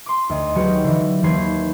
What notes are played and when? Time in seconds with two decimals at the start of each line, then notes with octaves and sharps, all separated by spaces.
0.06 C6 D6
0.30 D2 D#5
0.55 D#3 F#3 G#3 F#4 G4 B4
0.84 D3 E3
1.23 D#2 E3 C5 B5 G#6 C7